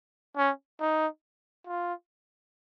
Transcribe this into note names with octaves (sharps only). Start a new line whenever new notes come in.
C#4
D#4
F4